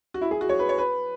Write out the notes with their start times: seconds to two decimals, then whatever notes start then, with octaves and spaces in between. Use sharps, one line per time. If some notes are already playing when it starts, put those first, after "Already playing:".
0.14 F#4
0.21 E4
0.31 G#4
0.41 F#4
0.49 C#5
0.59 B4
0.69 C#5
0.78 B4